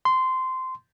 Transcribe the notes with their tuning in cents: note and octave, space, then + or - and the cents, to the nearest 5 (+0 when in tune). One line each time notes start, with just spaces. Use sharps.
C6 -15